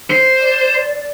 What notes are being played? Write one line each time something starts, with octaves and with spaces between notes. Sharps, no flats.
C5
D5